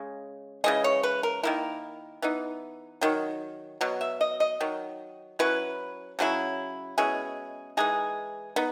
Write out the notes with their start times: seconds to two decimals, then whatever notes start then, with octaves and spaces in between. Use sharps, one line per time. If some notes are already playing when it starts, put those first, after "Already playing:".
Already playing: C#3 G#3
0.64 C#3 E3 G#3 D#5
0.84 C#5
1.03 B4
1.23 A#4
1.43 D#3 A#3 E4 A#4
2.22 E3 B3 D#4
3.01 D#3 F#3
3.81 B2 F#3
4.01 E5
4.21 D#5
4.40 D#5
4.61 D#3 F#3
5.39 F#3 C#4 E4 B4
6.19 C#3 F#3 C#4 E4
6.98 B2 G#3 C#4 E4 G#4
7.77 E3 G#3 D#4 G#4
8.56 B3 D#4